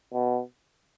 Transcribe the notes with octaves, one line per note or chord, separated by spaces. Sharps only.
B2